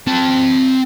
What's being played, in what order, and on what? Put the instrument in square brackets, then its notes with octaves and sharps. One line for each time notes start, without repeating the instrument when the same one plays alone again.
[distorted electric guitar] C4 A5